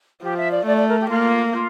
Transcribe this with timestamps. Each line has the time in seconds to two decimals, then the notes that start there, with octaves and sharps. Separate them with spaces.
0.23 F3 G4
0.37 E5
0.51 D5
0.66 A3 D5
0.76 D5
0.88 A#4
0.99 G4
1.09 A#3 F4
1.53 F4